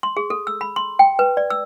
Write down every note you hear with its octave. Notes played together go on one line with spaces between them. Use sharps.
C6
G#4
A4
E6
B5
C6
G5
B4
D5
E6